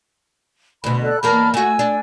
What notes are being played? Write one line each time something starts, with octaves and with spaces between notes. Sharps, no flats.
D2 B2 B5
A4 D5 F#6
E2 A#3 A#4 A5 B5 F6
A3 F#4 G#5 E6
D4